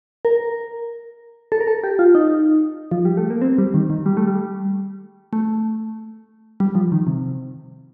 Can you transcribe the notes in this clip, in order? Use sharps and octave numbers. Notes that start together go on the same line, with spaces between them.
A#4
A4
A#4
A4
G4
F4
D#4
F3
G3
A3
A#3
C4
G3
D#3
D#3
G3
A3
G3
A3
G3
F3
D#3
C3